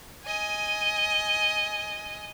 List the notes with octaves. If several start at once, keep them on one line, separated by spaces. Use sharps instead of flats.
D#5 G#5